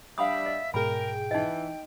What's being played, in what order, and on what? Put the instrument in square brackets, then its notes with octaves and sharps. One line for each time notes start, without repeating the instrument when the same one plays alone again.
[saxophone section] G3 D4 [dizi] E5 [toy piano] F5 B5 D#6
[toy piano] D#5
[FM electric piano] G#2 B2 G#4 [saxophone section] A#4 [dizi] G5 [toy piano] B5
[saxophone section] E3 [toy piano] D#4 D#5